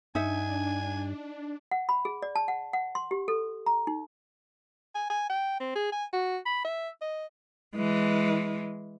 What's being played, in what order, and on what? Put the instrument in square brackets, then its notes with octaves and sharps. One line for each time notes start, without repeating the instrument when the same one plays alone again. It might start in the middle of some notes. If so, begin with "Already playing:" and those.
[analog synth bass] G2 [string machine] D4 [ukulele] D#4 E5 [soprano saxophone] G#5
[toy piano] F#5
B5
G#4
D5
A5
F#5
F#5
C6
G4
A4
A#5
D#4
[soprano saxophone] G#5
G#5
G5
C4
G#4
G#5
F#4
B5
E5
D#5
[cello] E3 G#3